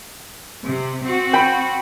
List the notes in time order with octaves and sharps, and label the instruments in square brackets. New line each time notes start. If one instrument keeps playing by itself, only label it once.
[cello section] C3
C4 F#4
[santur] G5 B5